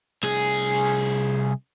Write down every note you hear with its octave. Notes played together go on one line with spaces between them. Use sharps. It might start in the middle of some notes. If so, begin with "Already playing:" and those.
C2 G#4